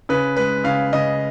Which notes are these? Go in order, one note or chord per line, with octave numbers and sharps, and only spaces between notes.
C#3 B4
G#3 B4
C#3 F5
C#3 D#5